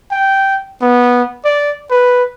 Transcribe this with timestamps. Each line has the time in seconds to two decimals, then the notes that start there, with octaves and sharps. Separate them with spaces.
0.12 G5
0.81 B3
1.45 D5
1.90 B4